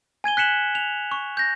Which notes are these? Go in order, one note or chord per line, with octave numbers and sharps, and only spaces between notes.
G#5 G#6 D#7 G7
F#6 B6 C#7 E7 F#7
F7
C#6
G6 A#6